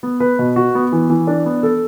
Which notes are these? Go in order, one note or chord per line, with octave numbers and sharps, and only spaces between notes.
B3
B4
B2
F#4
B3
E3
E3
D4
B3
A4